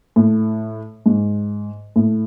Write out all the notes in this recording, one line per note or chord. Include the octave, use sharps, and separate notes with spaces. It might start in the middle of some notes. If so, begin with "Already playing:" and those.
A2
G#2
A2